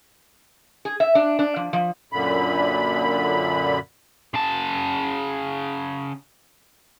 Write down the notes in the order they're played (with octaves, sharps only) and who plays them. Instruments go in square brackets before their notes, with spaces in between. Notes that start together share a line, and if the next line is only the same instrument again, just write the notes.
[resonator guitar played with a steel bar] G#4
E5
D4
D4
F3
F3
[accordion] F#2 A#2 D3 B5
[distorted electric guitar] C#3 A5